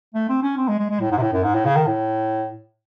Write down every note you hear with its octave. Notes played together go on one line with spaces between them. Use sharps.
A3
C4
C#4
C4
G#3
G#3
G#3
A2
G#2
C3
A2
F#2
G#2
A2
C#3
D#3
A2